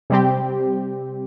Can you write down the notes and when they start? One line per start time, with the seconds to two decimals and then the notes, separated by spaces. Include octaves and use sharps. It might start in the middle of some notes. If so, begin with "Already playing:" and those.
0.10 C3 G3 C4 G4